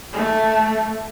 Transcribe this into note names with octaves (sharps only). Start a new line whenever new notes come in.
A3